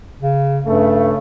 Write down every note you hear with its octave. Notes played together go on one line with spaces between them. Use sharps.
C#3
G2 C#3 A3